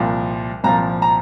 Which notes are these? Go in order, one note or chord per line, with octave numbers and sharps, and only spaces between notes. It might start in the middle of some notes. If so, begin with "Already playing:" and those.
Already playing: C2 A#2 F3
C2 A#2 F3 A#5
A#5